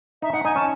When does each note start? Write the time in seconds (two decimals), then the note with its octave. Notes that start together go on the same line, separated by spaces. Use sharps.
0.22 D#4 E5
0.33 D#4 F#5
0.45 D#4 G#5
0.56 C#4 A5